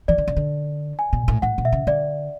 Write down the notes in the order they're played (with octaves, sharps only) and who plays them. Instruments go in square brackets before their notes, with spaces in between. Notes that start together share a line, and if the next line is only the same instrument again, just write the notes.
[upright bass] E3 [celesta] D5
[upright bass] D3
C#3
D3
[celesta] G#5
[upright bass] B2
A2
[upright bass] A2 [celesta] F#5
[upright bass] B2
[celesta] E5
[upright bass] C#3
[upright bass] D3 [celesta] D5